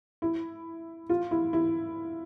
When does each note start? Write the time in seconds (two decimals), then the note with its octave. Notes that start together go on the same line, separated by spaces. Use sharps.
0.22 E4
1.09 F4
1.31 E4
1.53 E4